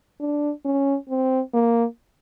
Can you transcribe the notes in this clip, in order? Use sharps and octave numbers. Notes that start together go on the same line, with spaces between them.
D4
C#4
C4
A#3